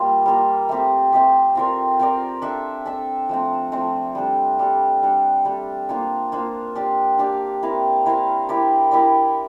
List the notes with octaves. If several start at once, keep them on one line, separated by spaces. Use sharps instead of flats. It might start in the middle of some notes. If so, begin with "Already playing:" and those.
Already playing: G3 A#3 F4 A#4
G3 A#3 F4 A#4
A3 C4 G4
A3 C4 G4
C4 F4 A#4 D5
C4 F4 A#4 D5
D4 A4 E5
D4 A4 E5
F3 A3 C4
F3 A3 C4
G3 D4 A4
G3 D4 A4
G3 D4 A4
G3 D4 A4
A#3 D4 F4 C5
A#3 D4 F4 C5
D4 G4 D5 F5
D4 G4 D5 F5
C4 E4 A#4 F5
C4 E4 A#4 F5
E4 G4 A#4 D5
E4 G4 A#4 D5